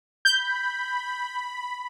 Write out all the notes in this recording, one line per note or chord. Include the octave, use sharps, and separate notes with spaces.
B5 G6